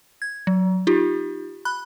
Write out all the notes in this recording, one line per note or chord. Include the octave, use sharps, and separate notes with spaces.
G#6
F#3
D#4 F4 G4
B5 F#6